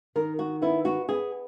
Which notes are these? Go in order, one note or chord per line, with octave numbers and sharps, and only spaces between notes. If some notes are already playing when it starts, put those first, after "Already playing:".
D#3 A#4
F#4
B3 E4
F#4
B3 G#4